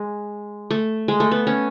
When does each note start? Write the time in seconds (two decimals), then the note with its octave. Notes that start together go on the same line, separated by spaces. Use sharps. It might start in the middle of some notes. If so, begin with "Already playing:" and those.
Already playing: G#3
0.71 A3
1.08 G#3
1.20 A3
1.31 B3
1.47 C#4